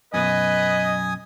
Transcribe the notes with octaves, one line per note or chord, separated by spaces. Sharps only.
F#2 B2 B4 D#5 G#5 D#6